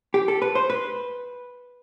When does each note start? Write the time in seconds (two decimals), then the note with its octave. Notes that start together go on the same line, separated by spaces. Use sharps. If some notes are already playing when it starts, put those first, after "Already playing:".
0.14 G4
0.28 A4
0.42 B4
0.55 C5
0.70 B4